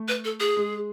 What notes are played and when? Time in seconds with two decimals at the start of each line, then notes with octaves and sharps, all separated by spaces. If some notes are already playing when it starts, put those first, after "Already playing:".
Already playing: A3
0.08 B4
0.24 A4
0.40 G#4
0.57 G#3